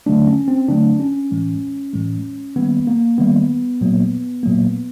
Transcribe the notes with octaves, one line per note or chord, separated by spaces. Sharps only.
D3 F#3 A3 D4
C#4
C4
D3 F#3 A3 D4
C#4
A2 E3 G#3
A2 E3 G#3
D#3 G3 A#3 B3
A#3
D#3 G3 A#3 B3
A#2 F#3 A#3
A#2 F#3 A#3